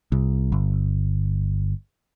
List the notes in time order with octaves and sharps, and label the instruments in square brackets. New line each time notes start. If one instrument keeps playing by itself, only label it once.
[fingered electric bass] C2
G1